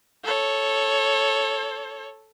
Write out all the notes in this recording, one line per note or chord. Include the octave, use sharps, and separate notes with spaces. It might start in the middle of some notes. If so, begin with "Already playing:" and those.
A4 C#5